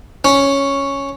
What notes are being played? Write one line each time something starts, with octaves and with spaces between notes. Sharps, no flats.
C#4